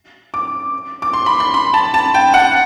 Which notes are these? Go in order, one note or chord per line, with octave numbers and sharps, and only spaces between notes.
D6
D6
C6
B5
C6
B5
A5
A5
G5
F#5